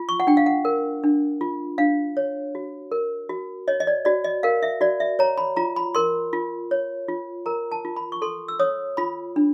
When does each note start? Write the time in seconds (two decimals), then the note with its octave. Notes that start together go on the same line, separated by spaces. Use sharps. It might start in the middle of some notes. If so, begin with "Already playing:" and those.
Already playing: F4
0.09 C#6
0.20 F#5
0.27 D4 G5
0.37 F5
0.46 F#5
0.65 A#4
1.04 D4
1.41 F4
1.78 D4 F5
2.17 C#5
2.55 F#4
2.92 A#4
3.29 F#4
3.68 C#5 D#5
3.80 D#5
3.87 D5
4.05 F#4 D5
4.24 D#5
4.43 A#4 F5
4.63 E5
4.81 F#4 D5
5.00 E5
5.19 C#5 A#5
5.38 B5
5.56 F4 A#5
5.76 B5
5.95 A#4 C6
6.33 F4
6.71 C#5
7.09 F4
7.46 A#4 A#5
7.72 A5
7.85 F4
7.96 B5
8.12 C#6
8.22 A4 C6
8.48 E6
8.59 C#5 D#6
8.97 F4 B5
9.36 D4